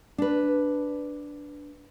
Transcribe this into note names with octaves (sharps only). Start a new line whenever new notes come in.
D4 B4